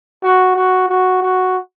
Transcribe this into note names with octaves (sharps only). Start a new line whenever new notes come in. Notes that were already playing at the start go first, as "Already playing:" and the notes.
F#4
F#4
F#4
F#4